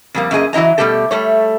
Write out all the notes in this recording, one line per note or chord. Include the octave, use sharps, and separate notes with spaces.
F2 G3 A#3
F#2 A#3 G#4 D#5
E3 F#3 E4 D#5 A#5
B2 D#3 G3 A3 G4 A4
G3 A3 C#5